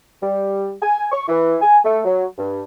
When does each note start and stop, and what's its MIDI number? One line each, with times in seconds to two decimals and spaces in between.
0.22 0.72 55
0.82 1.07 80
1.12 1.25 85
1.28 1.57 52
1.62 1.79 80
1.85 2.01 57
2.05 2.25 54
2.38 2.63 43